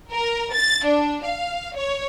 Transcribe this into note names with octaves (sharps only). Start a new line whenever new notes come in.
A#4
A6
D4
F5
C#5